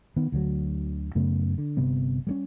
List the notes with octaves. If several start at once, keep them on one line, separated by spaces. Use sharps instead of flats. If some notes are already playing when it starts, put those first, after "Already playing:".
D#3 B3
D2 D3 F#3
F#2 C#3 A3 B3
D3
G1 C3 G3 B3
G3 G#3 C#4